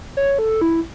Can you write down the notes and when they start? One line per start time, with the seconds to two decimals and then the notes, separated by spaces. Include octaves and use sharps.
0.17 C#5
0.39 A4
0.61 E4